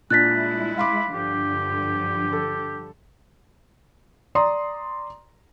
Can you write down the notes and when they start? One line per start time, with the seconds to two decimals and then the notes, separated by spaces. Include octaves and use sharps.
0.10 A#2 G#3 D4 E4 F#6 A6 B6
0.78 F5 B5 C6 D6
1.14 G2 D3 F3 G4
2.33 A4
4.35 D5 A#5 C6 D#6